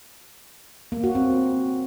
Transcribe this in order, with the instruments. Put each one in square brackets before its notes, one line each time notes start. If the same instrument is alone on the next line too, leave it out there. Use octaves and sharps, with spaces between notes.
[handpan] A#3
F#4
C4